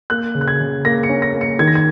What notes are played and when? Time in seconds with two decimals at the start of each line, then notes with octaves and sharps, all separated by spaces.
0.10 A#3 F#6
0.35 C#3
0.41 F#6
0.48 G#6
0.60 C#3
0.85 A#3 A#6
1.03 C#7
1.09 C#4
1.22 A#6
1.34 A#3
1.41 C#7
1.59 D#3 G#6
1.67 A#6
1.75 G#6